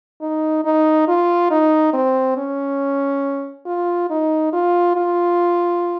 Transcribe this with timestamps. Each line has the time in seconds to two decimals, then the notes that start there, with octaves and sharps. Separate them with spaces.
0.21 D#4
0.65 D#4
1.08 F4
1.51 D#4
1.93 C4
2.37 C#4
3.66 F4
4.10 D#4
4.53 F4
4.96 F4